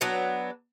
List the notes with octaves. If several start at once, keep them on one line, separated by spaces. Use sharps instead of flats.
F#3 B3 D4